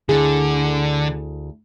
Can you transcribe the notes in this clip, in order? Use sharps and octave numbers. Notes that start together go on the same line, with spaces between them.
D2 D3 E4 G#4